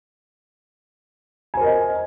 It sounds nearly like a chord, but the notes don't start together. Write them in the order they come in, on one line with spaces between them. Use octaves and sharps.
G#5 C5 A#4 D#5